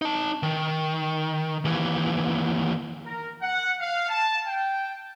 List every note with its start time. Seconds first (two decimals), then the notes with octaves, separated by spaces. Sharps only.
0.02 D#4 A5
0.43 D#3
1.65 D#2 E3
3.05 A#4
3.42 F#5
3.79 F5
4.09 A5
4.46 G5